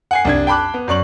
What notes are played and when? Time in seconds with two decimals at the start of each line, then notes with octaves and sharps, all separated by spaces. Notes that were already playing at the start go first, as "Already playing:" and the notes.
0.11 F#5 G#5 C7
0.25 C2 D4 G#6
0.47 G5 A5 B5 D6 F#6
0.74 B3
0.88 F#2 D5 C#6 F#7